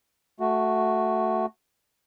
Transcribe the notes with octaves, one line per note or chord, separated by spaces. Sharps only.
A3 F#4